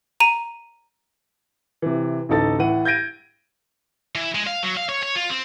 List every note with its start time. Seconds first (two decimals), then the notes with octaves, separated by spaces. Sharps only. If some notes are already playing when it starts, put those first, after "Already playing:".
0.20 A#5 D#7
1.82 C3 E3
2.29 A1 D2 D#4 A4 A6
2.59 A2 E3 F#5 D#7
2.85 G6 G#6 A#6 D7 D#7
4.15 E3
4.35 G#3
4.47 F5
4.63 F#3
4.77 F5
4.89 C#5
5.03 C#5
5.16 F4
5.30 C4